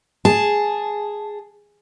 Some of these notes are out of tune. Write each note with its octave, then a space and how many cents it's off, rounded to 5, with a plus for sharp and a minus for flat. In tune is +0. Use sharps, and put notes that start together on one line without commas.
G#4 +0 A5 +0